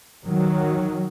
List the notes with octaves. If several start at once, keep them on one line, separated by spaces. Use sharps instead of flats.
D#3 F#3